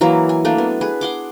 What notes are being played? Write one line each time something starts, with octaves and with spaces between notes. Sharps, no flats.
E3 F#3 A#3 E4
G#5
A3 A#3 D4
B3
G#4 B4
F#5 C6 D6